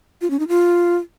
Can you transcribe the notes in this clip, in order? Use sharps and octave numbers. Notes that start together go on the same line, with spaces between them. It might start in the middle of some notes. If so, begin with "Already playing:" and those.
F4
C#4
D#4
F4